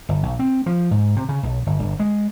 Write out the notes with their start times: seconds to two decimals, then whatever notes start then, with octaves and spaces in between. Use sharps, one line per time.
0.09 G1
0.23 B1
0.39 C4
0.66 F3
0.91 G#2
1.16 C3
1.29 C#3
1.43 B1
1.66 G1
1.79 G1
2.00 G#3